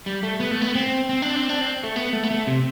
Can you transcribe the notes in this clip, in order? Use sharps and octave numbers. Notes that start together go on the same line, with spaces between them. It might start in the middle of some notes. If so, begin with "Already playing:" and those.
G3
A3
B3
A3
B3
C4
C4
D4
C4
D4
C4
A3
B3
A3
B3
A3
C3